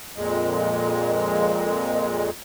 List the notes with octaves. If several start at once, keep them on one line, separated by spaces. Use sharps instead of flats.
F2 A#2 G#3